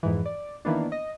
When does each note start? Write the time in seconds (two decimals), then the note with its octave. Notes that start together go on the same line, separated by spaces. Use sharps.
0.03 F2 G#2 E3
0.26 D5
0.65 D#3 E3 A#3 B3 D4
0.92 D#5